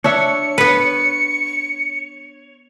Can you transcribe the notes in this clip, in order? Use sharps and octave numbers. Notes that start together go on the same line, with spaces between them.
D4 C#5 E5 C#7
B3 B4